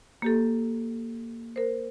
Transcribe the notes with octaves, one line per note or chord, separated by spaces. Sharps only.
A#3 G4 A4
A#4 C5